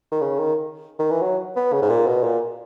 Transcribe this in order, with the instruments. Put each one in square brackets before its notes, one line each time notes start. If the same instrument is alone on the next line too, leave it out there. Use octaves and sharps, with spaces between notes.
[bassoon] D#3
C#3
D#3
D#3
E3
F#3
B3
C#3
G#2
A#2
B2
A#2